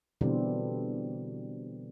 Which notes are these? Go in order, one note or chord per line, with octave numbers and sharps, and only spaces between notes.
B2 D3 E3 G3 C4